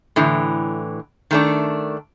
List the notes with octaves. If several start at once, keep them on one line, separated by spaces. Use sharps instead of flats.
A2 D3 E3
D#3 A3 D4